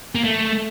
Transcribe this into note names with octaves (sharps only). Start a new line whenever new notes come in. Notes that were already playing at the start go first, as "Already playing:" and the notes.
A#3
A3